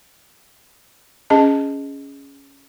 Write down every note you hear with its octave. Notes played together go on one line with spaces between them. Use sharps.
C#4 G#4 D#5 A5